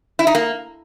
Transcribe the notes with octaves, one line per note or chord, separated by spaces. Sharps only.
E4
D#4
A#3